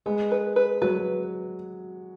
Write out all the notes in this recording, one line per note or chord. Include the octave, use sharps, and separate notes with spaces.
G#3 B3
B4
B4
F#3 B4